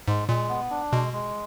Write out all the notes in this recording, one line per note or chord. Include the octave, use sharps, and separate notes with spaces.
G#2 G#3
A#2 G#3
B3
D4
B2 G#3
G#3